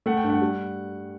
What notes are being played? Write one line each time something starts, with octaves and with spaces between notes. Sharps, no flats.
A3 F#5
G5
G2
F#5
G3